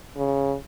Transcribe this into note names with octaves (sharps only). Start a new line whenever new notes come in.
C#3